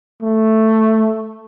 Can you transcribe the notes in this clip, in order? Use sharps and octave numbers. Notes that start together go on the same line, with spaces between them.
A3